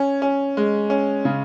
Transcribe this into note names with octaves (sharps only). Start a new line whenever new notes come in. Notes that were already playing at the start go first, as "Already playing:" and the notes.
Already playing: C#4
C#4
G#3
C#4
C#3